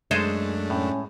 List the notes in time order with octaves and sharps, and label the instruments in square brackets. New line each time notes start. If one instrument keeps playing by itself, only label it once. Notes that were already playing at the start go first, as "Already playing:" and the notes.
[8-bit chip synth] F#2 A3 D4 [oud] G#3 [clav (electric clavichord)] A4 C5
[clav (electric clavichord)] A2 [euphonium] C#4